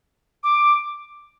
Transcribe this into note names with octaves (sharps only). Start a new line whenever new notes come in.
D6